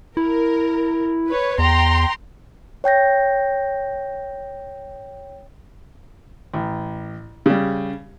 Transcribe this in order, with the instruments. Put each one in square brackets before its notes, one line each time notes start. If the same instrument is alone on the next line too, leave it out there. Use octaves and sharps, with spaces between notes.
[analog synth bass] E4 [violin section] A#4
[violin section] B4 C#5
[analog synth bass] E2 [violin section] G5 A#5 C6
[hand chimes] C#5 G5 G6 A#6
[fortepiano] A1
C#3 G3